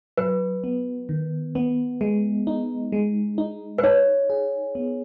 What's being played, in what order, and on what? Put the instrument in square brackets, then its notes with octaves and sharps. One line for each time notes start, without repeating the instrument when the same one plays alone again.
[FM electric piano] F#3 [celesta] B4
[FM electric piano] B3
D#3
B3
G#3
D#4
G#3
D#4
[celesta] B4
[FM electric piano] D#4 [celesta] C#5
[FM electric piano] G#4
B3